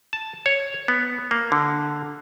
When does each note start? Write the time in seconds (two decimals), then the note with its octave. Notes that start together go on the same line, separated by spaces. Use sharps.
0.13 A5
0.46 C#5
0.88 B3
1.31 A#3
1.52 D3